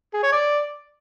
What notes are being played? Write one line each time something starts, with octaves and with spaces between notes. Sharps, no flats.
G#4
C#5
D5